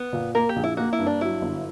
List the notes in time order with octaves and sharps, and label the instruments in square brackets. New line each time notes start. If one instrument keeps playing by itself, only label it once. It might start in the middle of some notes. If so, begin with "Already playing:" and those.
Already playing: [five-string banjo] B3
[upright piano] A#2
[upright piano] A#3 [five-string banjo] A#4
[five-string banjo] G4
[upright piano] A#1
[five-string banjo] E4
[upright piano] A#3 [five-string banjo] F#4
[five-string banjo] E4
[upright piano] G2
[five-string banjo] D4
[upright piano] F#3 [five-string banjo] E4
[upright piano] G1